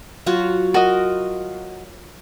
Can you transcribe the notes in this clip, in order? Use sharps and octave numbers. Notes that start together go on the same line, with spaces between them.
F#3 F4 F#4
F#4 A#4 D#5